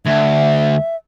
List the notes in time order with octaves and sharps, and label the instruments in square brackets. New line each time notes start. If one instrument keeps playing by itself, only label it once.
[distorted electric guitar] D2 [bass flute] E5